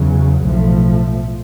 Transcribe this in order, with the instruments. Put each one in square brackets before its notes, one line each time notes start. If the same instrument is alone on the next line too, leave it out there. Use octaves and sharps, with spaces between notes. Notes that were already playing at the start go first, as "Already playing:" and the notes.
Already playing: [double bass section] E2 C#3 F#3
B1 A2 F3 A3